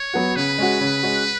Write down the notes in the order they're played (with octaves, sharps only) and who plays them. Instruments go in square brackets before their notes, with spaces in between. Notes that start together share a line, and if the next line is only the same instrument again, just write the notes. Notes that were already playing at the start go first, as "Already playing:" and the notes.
Already playing: [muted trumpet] C#5
[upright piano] F#3 B3 F#4
[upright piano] C#3 [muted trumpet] B4
[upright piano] G#3 C#4 F#4
C#3
G#3 C#4 F#4